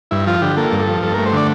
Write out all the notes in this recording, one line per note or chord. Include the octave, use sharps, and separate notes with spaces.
G2 E4
F3 F4
D3 G4
A#3 A4
G2
A4
F3
G2 A4
A3 A#4
C5
D3 D5